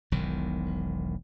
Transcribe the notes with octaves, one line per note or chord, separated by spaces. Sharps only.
E1 B1 E2 D#3